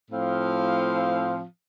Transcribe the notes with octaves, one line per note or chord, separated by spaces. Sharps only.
A2 F3 C4 F5